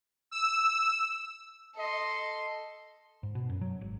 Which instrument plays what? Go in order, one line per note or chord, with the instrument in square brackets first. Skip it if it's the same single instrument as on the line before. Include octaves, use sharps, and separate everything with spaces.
[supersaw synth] E6
[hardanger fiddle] A4 C6 [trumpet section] D#5
[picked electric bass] G#2
B2
F#2
F#3
G#1